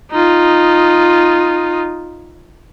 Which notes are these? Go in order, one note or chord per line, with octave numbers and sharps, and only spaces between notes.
D#4 F4